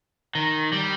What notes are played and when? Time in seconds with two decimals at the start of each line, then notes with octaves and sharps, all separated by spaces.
0.35 D#3
0.73 G3